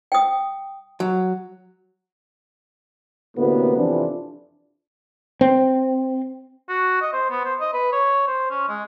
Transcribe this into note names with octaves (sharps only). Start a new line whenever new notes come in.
G5 D#6
F#3
D2 A2 C3 A#3 B3
F2 C3 E3 F3 D4
C4
F#4
D#5
C5
B3
C5
D#5
B4
C#5
C5
C#4
G#3